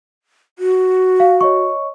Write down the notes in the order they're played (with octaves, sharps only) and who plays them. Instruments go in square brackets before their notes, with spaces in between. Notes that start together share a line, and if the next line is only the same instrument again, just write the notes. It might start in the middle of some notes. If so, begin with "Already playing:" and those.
[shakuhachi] F#4
[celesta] F5
C#5 D#5 C#6